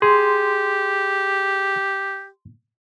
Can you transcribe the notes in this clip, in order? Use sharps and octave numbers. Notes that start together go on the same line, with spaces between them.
G4 G#4 C6